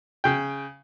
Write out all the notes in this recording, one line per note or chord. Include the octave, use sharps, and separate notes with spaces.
C#3 G5